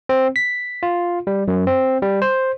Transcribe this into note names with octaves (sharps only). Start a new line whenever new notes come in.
C4
B6
F4
G3
F#2
C4
G3
C5